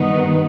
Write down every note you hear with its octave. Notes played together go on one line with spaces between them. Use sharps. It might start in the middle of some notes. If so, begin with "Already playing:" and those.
Already playing: G2 D#3 B3 D#4